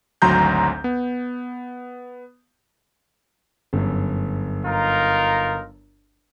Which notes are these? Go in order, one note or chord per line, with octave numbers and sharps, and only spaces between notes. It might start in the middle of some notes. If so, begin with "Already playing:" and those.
G#1 D2 F#3 A#5 C6 G6
B3
G1 F#2
D#4 F4 A#4